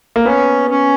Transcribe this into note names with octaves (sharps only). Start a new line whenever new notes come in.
A#3
B3 C#4
C#4